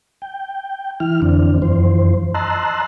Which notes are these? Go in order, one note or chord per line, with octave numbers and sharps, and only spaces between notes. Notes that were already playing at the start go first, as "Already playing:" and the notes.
G5
E3 E4 F6
F2 D3 E3 C4 D4
F#2 E3 F3 C5
D#5 A5 A#5 C6 E6 F#6